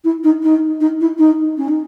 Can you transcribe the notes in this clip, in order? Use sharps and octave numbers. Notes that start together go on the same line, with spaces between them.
E4
D#4
D#4
D#4
E4
D#4
C#4
D#4